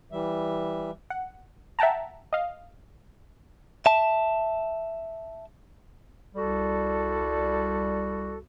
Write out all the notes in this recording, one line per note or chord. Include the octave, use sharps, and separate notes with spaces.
E3 G3 E5
F#5
E5 F#5 G5 A5 A#5
D#5 F5
E5 A5
C2 G3 F#4 A4